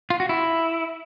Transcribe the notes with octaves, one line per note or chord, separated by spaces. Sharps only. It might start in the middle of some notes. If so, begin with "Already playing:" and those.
F4
F#4
E4